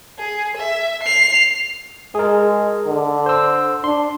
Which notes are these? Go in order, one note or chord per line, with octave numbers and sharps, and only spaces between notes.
G#4
E5
C7 F7
G#3 G#4 A#4
D3
C5 E6
D4 C6